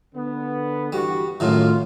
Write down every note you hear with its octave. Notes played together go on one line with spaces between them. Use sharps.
D3 B3
G2 E3 G3 F#4
F#2 A2 D#3 F4